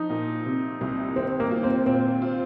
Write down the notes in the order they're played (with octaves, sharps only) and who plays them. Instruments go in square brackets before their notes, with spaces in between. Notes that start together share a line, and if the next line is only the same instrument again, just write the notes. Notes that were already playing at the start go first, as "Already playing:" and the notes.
Already playing: [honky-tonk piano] F3 [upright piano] D#4
[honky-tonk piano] A#2
C3
C2
[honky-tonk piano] D#3 [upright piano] C4
[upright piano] A#3
[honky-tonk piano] F4
[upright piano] C4
[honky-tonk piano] A#2 [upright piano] C4
[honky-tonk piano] F4